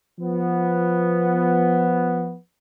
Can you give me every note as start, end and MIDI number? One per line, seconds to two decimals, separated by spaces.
0.18 2.34 53
0.18 2.34 59